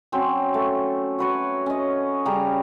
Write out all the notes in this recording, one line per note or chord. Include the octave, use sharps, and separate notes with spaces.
F#3 C4 C#4
A3
F#4 B4 C#5
C#4 D#5
C#3 G3 A#5